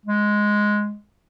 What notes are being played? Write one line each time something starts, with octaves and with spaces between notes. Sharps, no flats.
G#3